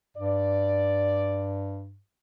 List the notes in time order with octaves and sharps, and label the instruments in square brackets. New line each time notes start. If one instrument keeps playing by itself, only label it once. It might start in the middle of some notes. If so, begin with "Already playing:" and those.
[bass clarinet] G2 [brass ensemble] D5